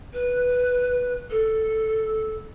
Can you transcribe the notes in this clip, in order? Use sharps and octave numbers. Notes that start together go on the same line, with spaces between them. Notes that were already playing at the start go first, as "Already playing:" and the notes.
B4
A4